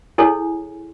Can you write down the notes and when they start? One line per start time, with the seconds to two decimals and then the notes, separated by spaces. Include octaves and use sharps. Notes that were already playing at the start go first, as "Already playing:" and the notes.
0.18 E4 G#4 A4 C#5 G#5